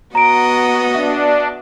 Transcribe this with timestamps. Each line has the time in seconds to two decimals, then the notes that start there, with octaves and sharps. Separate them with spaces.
0.15 B3 F#4 D#5 A#5 D7
0.94 D4 E5